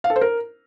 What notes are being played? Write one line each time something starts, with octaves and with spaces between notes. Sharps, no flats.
F5
A4
C5
A#4